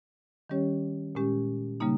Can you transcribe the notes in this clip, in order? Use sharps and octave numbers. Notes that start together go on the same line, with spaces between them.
D#3 G3 C#4 G4 C#5
A#2 G#3 C#4 G4
C#3 G3 A#3 D#4